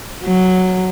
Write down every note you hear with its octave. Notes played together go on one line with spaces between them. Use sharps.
F#3